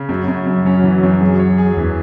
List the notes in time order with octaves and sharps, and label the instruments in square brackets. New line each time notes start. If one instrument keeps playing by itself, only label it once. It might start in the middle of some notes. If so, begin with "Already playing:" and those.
Already playing: [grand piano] C#3
[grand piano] F#2 [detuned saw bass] F#3
[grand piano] F#2
F#2
[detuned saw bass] F#3 [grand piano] C#4
[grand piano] E3
F#2
[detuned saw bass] F#3 [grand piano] G#4
[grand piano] C#5
G#4
[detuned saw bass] E2 [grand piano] E3